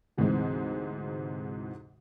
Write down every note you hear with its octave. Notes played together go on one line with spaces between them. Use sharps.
D2 G#2 C3 E3 G#3 C4